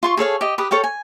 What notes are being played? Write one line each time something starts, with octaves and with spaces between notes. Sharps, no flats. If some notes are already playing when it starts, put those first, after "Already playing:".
F4 C6 C#6
G#4 A4 C#5 F5
G4 D#5
G4 B4 D#6
A4 C#5 F5 G5
G#5